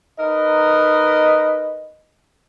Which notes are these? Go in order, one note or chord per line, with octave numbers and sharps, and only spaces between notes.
D#4 A#4 B4 D#5